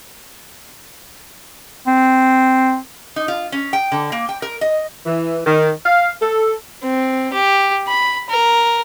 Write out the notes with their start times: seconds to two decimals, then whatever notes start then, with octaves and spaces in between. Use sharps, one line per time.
1.87 C4
3.16 D#4
3.28 F4
3.52 C#4
3.73 G5
3.92 D3
4.12 A#3
4.29 G5
4.42 A#4
4.61 D#5
5.06 E3
5.46 D#3
5.86 F5
6.21 A4
6.83 C4
7.33 G4
7.88 B5
8.30 A#4